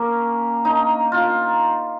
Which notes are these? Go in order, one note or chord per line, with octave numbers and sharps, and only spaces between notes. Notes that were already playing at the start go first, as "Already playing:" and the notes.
Already playing: A#3 C#4
D#4
F4